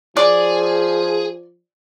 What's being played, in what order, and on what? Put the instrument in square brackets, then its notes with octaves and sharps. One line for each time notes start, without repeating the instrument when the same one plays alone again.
[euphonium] F3 [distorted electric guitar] G#4 [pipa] D5